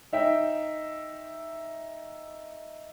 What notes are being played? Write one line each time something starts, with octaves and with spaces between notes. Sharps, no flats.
D#4 E5 G5